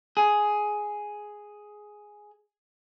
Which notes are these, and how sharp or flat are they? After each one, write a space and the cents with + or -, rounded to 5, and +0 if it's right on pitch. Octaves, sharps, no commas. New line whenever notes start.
G#4 +5